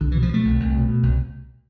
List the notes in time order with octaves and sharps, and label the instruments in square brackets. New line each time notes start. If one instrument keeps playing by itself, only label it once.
[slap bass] C2 D3
E3
B2
F3
B2 A3
C2
C2
B2
B2
C2